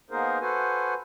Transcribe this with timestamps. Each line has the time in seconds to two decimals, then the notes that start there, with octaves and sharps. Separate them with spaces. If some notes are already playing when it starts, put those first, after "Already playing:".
0.10 A#3 B3 D#4 G#4 A#4 C5
0.41 F#4 A4 B4 C5 G#5